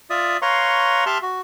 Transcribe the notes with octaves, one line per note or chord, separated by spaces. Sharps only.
F4 D5 E5 D#6
B4 C#5 F5 A#5 C6 C#6
G4 E5 A5 C6 F6
F#4